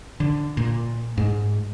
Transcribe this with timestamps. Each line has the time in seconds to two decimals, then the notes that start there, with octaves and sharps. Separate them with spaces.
0.20 D3
0.57 A#2
1.18 G#2